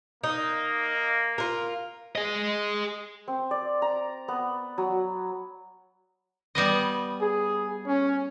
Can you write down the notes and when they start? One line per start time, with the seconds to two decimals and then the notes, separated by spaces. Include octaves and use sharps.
0.24 A#3 D#4
1.38 F4 A#4
2.16 G#4 D#5
3.28 C4
3.51 D5
3.82 A#5
4.28 B3
4.78 F#3
6.55 G3 B3 D#5
7.21 G#4
7.87 C#4